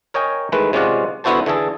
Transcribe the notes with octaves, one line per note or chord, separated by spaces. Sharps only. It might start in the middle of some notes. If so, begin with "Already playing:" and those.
A#4 C#5 D#5 G5 G#5
D#3 E3 G#3 A3 B4
C3 G#3 C#4 F4 D5 F#5
D3 B3 E4 F#4 C5 A5
D3 E3 G#4 A4